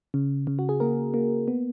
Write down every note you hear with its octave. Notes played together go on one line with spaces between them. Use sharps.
C#3
C#3
F#4
G#4
A#3 A#4
A#3
B3